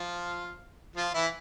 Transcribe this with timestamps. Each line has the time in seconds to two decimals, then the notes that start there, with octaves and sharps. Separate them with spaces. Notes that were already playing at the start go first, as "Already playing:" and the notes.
Already playing: F3 F4
0.96 F3 F4
1.14 E3 E4